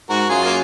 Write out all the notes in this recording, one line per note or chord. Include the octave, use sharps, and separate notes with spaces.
G#2 F#4 A#4
F#2 F4 G#4
A#3